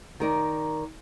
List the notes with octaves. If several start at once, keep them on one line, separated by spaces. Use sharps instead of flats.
D#3 A#4 D5